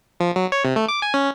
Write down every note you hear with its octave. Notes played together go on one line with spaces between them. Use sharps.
F3
F#3
C#5
C3
A3
D6
G#5
C#4